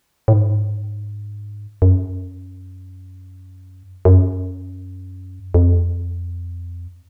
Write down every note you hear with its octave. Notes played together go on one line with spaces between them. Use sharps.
A2
G#2
F#2
F#2
F2